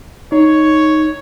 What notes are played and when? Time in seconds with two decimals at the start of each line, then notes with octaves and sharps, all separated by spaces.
0.32 D#4 C#5